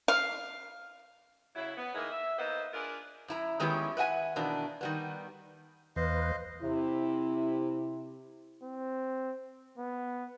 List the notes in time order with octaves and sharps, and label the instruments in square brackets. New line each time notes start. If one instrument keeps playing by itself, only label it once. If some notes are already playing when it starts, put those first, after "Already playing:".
[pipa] F5
[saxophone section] C#3 F#3 E4
B3
D#3 G#3 A#3 D#4 E4
E5
A#3 B3 D#4 C5 D#5
D4 F4 G#4 A#4 B4
[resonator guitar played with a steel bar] F#2 E4 A#5
D#3 G#3 B3 C#4 E4 G4
B4 E5 F#5 G#5
B2 D#3 E3 A#3 D4
D#3 G3 B3
[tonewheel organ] E2 B4 [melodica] C5 D#5 F5
[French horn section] C3 E4
[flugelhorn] C4
B3